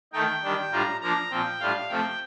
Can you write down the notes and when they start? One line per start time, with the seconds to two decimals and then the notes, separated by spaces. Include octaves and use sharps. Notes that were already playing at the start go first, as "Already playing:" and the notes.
0.13 D#3 A3 D#4 G5
0.42 D#3 G3 D4
0.72 A2 G3 D4 F4 A#5
1.01 F3 A#3 D4 A#5
1.30 A#2 F3 C4 G5
1.60 A2 G3 D4 F4 F5
1.89 C3 F3 A3 C4 G5